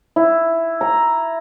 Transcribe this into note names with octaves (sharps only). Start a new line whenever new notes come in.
E4
A#5